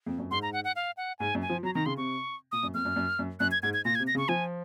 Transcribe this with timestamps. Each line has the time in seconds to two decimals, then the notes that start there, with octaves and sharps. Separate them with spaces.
0.06 F2
0.19 F#2
0.31 G#2 C6
0.42 A#5
0.53 F#5
0.64 F#5
0.76 F5
0.97 F#5
1.19 G#2 G#5
1.35 F#2
1.42 G#5
1.49 F3
1.63 F#3 A#5
1.75 D#3 A#5
1.86 C#3 C6
1.97 C3 C#6
2.52 A#2 D#6
2.63 F#2
2.74 F2 F6
2.85 F#2
2.96 F#2
3.19 F#2
3.40 F#2 F#6
3.52 G#6
3.63 G#2 G#6
3.74 G#6
3.85 A#2 A#6
3.95 G#6
3.99 C3
4.07 A#6
4.15 C#3
4.18 C#6
4.29 F3 G#5